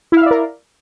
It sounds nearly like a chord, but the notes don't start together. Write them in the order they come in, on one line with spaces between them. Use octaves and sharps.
E4 F5 E5 D5 A#4